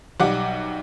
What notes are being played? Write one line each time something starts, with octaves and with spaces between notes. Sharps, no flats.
B1 G3 F#5 D6